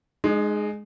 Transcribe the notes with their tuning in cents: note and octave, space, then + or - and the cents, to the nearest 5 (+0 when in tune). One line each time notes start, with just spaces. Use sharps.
G#3 +10 D#4 -30